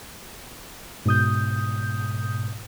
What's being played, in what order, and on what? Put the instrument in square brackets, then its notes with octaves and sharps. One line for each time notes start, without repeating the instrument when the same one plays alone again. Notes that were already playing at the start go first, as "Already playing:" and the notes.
[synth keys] G#2 B2 D#6 G6